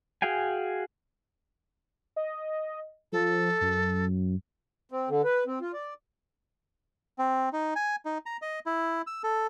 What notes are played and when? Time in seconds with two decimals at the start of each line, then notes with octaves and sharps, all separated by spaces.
0.22 F#4 G#4 F5 G5 G#5
2.16 D#5
3.12 F3 A4
3.61 F#2
4.92 C4
5.09 D3
5.24 B4
5.47 C4
5.61 F4
5.74 D5
7.18 C4
7.53 D#4
7.76 G#5
8.05 D#4
8.26 A#5
8.42 D#5
8.66 E4
9.07 E6
9.23 A4